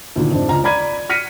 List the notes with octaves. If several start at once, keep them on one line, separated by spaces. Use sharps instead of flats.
D2 A#2 D#3
F2 G#2 C3 D4
C#2 F4 A#5
D5 A#5 B5 G#6 D#7
F6 A#6 B6 C#7 D#7